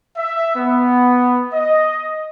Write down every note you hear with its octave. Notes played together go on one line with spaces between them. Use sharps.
E5
B3
D#5